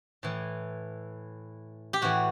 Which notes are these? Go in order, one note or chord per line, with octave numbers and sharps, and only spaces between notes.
A2 E3
G4
A2 E3 F#4